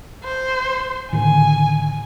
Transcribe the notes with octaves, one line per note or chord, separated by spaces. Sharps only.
C5
A2 D3 D#3 G#5